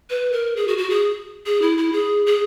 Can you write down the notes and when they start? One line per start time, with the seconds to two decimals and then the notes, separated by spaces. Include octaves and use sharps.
0.10 B4
0.32 A#4
0.56 G#4
0.68 F#4
0.78 F#4
0.90 G#4
1.46 G#4
1.62 E4
1.78 E4
1.92 G#4
2.26 G#4